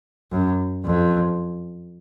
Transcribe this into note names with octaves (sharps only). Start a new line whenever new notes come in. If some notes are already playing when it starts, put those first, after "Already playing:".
F#2
F2